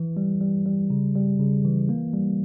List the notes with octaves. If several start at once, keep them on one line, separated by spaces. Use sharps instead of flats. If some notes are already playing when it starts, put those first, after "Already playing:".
Already playing: E3
G3
G3
G3
C#3
G3
C#3
E3
A#3
G3